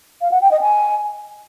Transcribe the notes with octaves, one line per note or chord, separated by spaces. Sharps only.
F5
F#5
G5
D#5
G#5